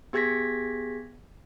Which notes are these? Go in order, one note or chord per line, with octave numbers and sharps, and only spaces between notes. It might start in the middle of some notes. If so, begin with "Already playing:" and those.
B3 G4 G#4 G#6 A#6 B6